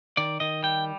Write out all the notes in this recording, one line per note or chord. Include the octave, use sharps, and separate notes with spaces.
D#3 D5
D#3 D#5
G3 G5